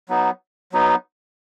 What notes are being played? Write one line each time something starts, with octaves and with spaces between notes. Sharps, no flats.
F#3 B3 D#4
F#3 B3 D#4